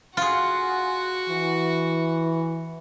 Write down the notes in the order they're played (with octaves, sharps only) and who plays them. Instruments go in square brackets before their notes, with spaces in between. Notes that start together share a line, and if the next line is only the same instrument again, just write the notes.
[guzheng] F4 G#4 [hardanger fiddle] F#4 F#5
[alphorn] E3